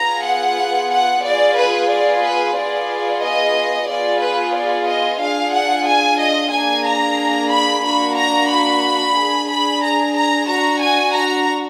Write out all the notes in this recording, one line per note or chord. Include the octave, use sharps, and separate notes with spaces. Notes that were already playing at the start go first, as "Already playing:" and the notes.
Already playing: B3 F4 G#4 A#5
F#5
F#5
B3 F4 G#4 D5
B4
D5
B4
B3 F4 G#4 D5
D#5
B3 F4 G#4 D5
B4
D5
D#5
D4 F4 G#4 F5
F#5
G#5
D#5
A#3 D4 G#4 G#5
A#5
B5
A#3 D4 F#4 B5
A#5
B5
D4 G#4
B5
A#5
A#5
D4 F#4 A#5
G#5
A#5